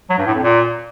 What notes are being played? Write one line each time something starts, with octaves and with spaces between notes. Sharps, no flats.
F#3
G2
A2
F2
A#2